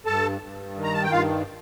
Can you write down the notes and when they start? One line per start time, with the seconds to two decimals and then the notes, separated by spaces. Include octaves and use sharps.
0.06 G2 A4 A5
0.41 G2
0.77 D#3
0.84 A#5
0.93 A5
1.03 G5
1.12 G2 F4 F5